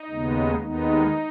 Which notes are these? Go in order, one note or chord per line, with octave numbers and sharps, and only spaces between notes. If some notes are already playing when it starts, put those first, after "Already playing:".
Already playing: D#4
D#2 C#3 G#3 B3
D#2 D#3 G#3 B3 D#4